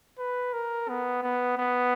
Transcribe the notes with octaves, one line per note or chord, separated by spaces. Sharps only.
B4
A#4
B3
B3
B3